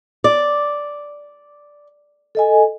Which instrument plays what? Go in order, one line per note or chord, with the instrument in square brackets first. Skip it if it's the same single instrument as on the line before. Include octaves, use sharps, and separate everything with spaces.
[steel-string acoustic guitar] D5
[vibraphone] A4 D#5 G#5